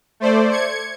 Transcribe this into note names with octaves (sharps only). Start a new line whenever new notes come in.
A3 C5 D5
G#6 C#7